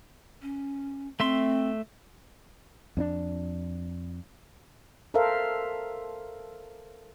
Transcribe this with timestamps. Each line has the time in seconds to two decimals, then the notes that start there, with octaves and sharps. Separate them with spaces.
0.42 C#4
1.20 A3 C4 E5 C6
2.97 F2 C#4 D4
5.14 A4 A#4 C5 E5 F5